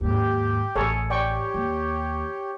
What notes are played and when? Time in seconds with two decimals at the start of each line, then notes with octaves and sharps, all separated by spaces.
0.01 D#2 G#2 G4
0.76 A1 G#4 A4 C#5
1.10 G4 C#5 D5 G5 C#6
1.54 D#2